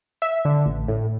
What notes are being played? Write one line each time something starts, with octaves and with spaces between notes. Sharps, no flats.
E5
D3
A1
A2